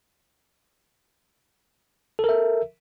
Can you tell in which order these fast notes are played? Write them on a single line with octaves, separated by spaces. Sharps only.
A4 A#4 E5